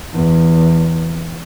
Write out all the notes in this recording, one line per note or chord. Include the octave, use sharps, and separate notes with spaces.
E2